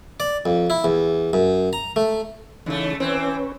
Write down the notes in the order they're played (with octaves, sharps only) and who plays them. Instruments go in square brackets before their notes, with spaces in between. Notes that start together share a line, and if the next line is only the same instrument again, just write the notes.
[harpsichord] D5
F2
E4
E2
F#2
A#5
A3
[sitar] C#3 A3 [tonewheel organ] E3 D#4
[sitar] E3 C4 [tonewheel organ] C#4 B4 C#5